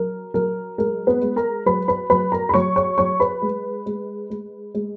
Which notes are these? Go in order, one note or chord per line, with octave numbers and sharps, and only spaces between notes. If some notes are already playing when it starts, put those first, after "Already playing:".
Already playing: F#3 A#4
F#3 A#4
G#3 A#4
B3 B4
G#3
A#4 A#5
F#3 B4 B5
B4 B5
F#3 B4 B5
A#4 A#5
B5
F#3 C#5 C#6
C#5 C#6
F#3 C#5 C#6
B4 B5
G#3
G#3
G#3
G#3